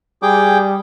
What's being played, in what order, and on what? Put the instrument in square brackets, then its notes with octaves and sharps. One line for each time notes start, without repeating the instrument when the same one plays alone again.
[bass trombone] G3 [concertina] G#4 G5 D6